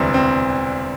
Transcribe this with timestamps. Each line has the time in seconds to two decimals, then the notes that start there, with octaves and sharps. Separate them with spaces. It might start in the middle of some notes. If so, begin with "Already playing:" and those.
Already playing: E1 D2 C3 E3 G3 C4
0.14 C4